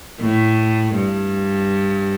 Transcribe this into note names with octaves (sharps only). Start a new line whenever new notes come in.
A2
G2